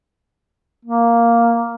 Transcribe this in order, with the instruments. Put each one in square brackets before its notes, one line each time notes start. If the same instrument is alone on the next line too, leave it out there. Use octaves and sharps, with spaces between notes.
[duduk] A#3